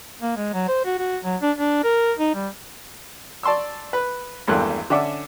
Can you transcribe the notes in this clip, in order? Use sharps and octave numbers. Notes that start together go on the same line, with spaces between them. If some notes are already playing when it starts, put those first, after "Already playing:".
A#3
G#3
F#3
C5
F#4
F#4
F#3
D4
D4
A#4
D#4
G3
D5 A5 C6 C#6 E6
B4
G#1 E2 G2 A3 A#3 F#6
D3 C#4 D4 E5 F#5 D6